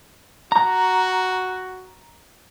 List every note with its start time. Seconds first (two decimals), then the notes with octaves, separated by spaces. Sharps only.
0.52 F#4 A#5